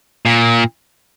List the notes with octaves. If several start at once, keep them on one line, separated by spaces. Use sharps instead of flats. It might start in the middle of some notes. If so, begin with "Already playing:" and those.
A#2